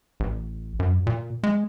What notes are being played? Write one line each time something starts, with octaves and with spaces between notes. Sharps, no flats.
A1
F#2
A#2
G#3